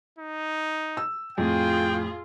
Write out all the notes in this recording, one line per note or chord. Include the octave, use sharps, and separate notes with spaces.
D#4
E6
F2 A2 F4 G#4 G5